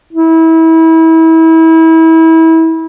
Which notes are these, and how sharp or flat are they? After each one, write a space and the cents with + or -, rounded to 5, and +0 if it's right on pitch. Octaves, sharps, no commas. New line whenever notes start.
E4 -30